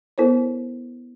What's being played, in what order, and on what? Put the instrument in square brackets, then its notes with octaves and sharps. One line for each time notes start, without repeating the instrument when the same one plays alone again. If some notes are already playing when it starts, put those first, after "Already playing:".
[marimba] B3 E4 A4 A#4 C5 C#5